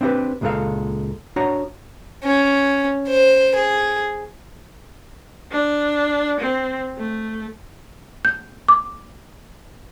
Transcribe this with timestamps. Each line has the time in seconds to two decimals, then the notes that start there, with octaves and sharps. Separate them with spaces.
0.01 C4 D4 E4 G4 B4
0.41 C#2 A#2 G#3 B3 A4 F5
1.36 D4 F#4 C#5 A#5
2.23 C#4
3.07 C5
3.55 G#4
5.51 D4
6.41 C4
6.97 A3
8.25 G6
8.68 D6